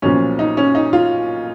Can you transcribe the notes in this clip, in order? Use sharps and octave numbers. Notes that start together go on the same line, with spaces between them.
B1 A#2 F3 C#4
D#4
C#4
D#4
F4